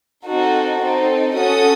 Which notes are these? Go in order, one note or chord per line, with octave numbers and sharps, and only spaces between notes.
C4 D#4 F#4 A4
C4 D#4 A4
C#4 F#4 A4 D#6